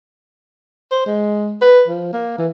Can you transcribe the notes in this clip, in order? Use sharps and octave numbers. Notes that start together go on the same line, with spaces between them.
C5
G#3
B4
F3
A#3
E3